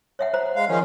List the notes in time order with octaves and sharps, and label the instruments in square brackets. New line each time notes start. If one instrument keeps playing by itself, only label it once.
[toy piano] C#5 E5 F#5
C5 A#5
[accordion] G#3 F5
D#3 F3 C#4